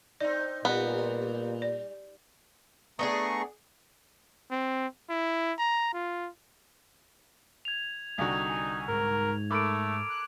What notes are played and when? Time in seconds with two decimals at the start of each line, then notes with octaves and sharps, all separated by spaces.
0.20 C4 D#4 D5
0.65 A#2 G3 B3
1.62 D5
2.99 A3 B3 D4 G#4 A#5 C#6
4.51 C4
5.10 E4
5.59 A#5
5.93 F4
7.65 G#6 F7
8.18 C2 D3 D#4 F#4 G#5
8.48 G#5
8.88 G#2 A#4
9.51 A3 A4 A#4 B5 D6 D7
10.09 F#6